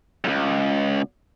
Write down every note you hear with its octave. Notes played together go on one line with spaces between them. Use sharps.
C#2 F#2